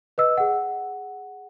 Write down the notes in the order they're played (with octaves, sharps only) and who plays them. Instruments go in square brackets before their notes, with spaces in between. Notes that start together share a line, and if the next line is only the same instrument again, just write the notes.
[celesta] B4 D#5 E6
G#4 F#5